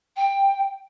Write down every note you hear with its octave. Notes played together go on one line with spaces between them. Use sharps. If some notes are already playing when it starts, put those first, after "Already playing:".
G5